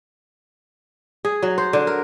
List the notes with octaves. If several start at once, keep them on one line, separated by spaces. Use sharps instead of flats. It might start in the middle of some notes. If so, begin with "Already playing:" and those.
G#4
F#3
C5
D3
A#4